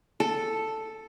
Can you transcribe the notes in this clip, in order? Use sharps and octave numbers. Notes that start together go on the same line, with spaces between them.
A4